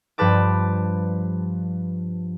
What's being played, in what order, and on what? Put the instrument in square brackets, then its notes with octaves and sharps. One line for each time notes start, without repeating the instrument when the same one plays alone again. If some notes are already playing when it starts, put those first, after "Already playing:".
[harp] G2 F3 G4 B4 A5 D6